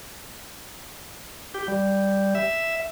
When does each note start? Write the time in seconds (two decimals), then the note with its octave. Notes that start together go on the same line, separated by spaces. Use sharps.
1.54 G4
1.68 G3
2.35 E5